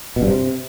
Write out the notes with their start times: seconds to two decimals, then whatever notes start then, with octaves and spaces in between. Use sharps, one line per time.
0.16 B2
0.22 G2
0.27 C3